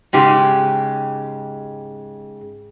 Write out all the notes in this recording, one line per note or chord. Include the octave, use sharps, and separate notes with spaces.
G#2 C#3 G4